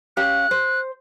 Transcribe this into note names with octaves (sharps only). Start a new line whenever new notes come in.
C#4 G4 F5 F#6
C5